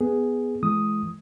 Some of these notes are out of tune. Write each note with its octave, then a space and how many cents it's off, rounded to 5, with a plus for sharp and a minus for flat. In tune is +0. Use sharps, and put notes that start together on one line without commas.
B3 +0 G#4 +0
E3 +20 G#3 +30 D#6 +0